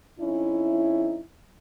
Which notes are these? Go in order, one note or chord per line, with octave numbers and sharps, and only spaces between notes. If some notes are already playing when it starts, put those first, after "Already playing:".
F2 C#4 D#4 E4